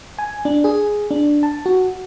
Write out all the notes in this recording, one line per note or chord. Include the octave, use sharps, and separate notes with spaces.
G#5
D4
G#4
D4
A5
F#4